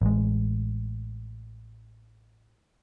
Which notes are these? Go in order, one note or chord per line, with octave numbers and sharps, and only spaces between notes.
A1 G#3